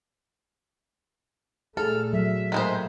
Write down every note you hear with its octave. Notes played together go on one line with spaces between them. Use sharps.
A#2 A3 G#4 A4 F6
F#3 E5
A2 D#3 G#3 A#3 C5